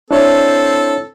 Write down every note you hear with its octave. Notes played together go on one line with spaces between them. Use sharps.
C4 D4 E4 A4 C#5